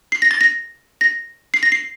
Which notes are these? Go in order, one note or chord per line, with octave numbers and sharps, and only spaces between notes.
C7
A#6
A6
A#6
A#6
C7
A#6
C7